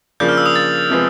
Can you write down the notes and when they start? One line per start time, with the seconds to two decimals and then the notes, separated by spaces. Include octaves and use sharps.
0.20 C#3 F3 A#3 D4 G6
0.29 F6
0.38 E6
0.46 D#6
0.56 A6
0.90 C3 F3 G#3 B3